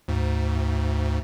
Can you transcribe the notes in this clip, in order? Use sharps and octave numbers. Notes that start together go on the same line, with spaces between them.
D2 G#2